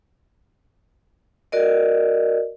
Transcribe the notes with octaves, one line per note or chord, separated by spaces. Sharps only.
F#4 A#4 D5 D#5